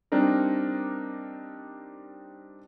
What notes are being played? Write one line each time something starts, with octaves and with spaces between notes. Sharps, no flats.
G3 C4 D4 D#4 A#4